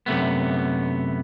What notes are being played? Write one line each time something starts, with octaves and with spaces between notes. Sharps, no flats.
F#2 C3 A3 B3